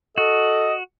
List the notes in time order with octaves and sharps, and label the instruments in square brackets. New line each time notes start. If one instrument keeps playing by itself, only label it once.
[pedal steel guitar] F#4 [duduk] A4 [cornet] D#5